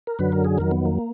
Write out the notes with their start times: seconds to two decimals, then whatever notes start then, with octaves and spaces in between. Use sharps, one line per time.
0.07 A#4
0.19 F#2 D3 F#3 B4
0.32 A#4
0.45 G#4
0.58 F2 D#3 F#3 A#4
0.71 B3
0.85 A#3